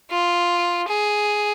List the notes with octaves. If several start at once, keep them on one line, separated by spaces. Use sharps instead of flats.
F4
G#4